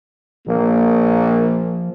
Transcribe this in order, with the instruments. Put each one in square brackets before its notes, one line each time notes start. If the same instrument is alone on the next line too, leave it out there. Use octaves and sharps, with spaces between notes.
[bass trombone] A#1 [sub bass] F3 [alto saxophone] A#3